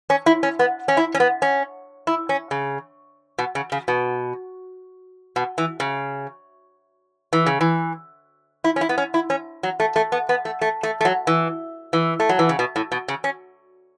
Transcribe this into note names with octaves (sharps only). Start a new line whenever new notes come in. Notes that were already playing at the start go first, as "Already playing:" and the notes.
C#4
E4
C#4
B3
C#4
E4
C#4
B3
C#4
E4
C#4
C#3
B2
C#3
C#3
B2
B2
E3
C#3
E3
C#3
E3
E4
C#4
E4
B3
C#4
E4
C#4
F#3
A3
A3
B3
B3
A3
A3
A3
A3
F#3
E3
E3
A3
F#3
E3
C#3
B2
A2
B2
C#3
C#4